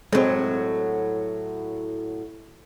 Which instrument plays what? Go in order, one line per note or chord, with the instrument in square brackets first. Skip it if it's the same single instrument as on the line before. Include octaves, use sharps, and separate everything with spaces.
[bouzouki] A2 F#3 [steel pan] G#3 C4